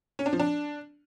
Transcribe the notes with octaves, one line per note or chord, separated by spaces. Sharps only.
C#4
D4
F3
D4